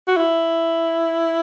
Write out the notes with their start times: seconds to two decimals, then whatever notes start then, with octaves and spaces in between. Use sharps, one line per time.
0.08 F#4
0.16 E4